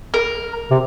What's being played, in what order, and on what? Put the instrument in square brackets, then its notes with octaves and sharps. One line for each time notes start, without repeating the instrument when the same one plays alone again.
[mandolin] A#4
[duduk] C3